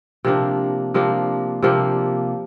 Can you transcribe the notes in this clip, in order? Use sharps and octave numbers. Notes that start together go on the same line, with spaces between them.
C3 F3 A#3 D4
C3 F3 A#3 D4
C3 F3 A#3 D4